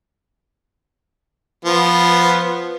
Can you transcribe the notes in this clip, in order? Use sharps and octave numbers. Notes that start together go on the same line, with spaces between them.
F3 B3